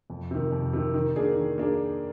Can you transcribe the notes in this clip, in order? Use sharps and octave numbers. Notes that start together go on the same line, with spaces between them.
F2
C3 D#3
F2
C3 D#3
D#3
A#3 D4 G#4
D#3
A#3 D4 G#4